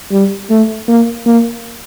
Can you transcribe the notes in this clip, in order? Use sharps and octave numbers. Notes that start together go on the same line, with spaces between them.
G3
A3
A#3
A#3